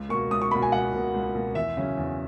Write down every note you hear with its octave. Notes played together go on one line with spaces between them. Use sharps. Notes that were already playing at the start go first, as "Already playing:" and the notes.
Already playing: C#2
B2 A#3 C#6
C#2 D#6
C#6
B2 A#3 B5
G#5
C#2 F#5
B2 A#3
C#2
B2 A#3
E2 E5
C#3 F#3 C#4
E2